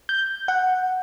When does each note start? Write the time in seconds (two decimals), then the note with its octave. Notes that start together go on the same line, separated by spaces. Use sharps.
0.09 G6
0.48 F#5